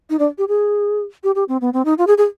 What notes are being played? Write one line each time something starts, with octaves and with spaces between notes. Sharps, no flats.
D#4
D4
G4
G#4
G4
G4
C4
B3
C4
D#4
F4
G#4
G#4